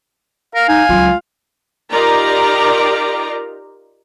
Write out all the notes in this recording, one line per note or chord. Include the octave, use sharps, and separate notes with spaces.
A#4 F5
D#4 G#5
C#2 F#3 F4
D#4 F4 G4 A#4 D5 A#5